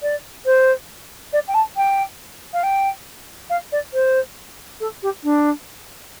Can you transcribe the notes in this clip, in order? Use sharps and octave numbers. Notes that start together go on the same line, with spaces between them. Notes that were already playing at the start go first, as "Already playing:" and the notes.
D5
C5
D5
G5
A5
G5
F5
G5
F5
D5
C5
A4
G4
D4